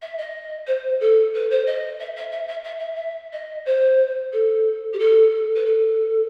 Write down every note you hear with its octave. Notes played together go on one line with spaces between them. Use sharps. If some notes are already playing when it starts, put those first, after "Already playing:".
E5
D#5
C5
A4
B4
C5
D#5
E5
E5
E5
E5
E5
E5
E5
D#5
C5
A4
G4
A4
B4
A4